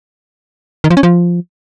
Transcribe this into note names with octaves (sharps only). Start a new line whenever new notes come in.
D#3
F3
C#4
F3